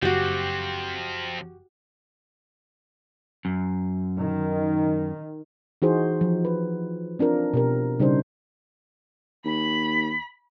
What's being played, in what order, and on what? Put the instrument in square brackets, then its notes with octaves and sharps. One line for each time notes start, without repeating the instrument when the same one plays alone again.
[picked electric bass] F#1 [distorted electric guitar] F3 C4 [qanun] F#4 G4
[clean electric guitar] F#2
[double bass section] D#3
[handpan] E3 D#4 F#4 G#4 C5
F3
B4
C4 D4 F4 A#4
B2 G4 A#4
C#3 G3 D4 D#4 C5
[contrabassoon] D#2 [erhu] B5